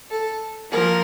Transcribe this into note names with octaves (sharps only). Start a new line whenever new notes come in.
A4
F3 A#3 A#4